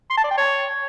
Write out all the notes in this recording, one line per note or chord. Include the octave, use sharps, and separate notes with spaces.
C6
A5
D5
G5
C#5